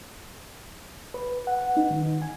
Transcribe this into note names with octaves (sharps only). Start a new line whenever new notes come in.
B4
F#5
D#4
D#3
G#5